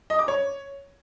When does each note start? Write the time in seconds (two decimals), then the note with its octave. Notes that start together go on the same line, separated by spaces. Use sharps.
0.10 D#5
0.19 D6
0.28 C#5